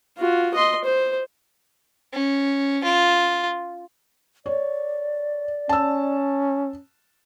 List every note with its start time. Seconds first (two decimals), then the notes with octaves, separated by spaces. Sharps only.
0.18 F4 F#4
0.54 D#5 C6
0.84 C5
2.13 C#4
2.84 F4
4.46 C#5 D5
5.69 C#4 A5 E6